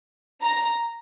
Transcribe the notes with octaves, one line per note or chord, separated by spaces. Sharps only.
A#5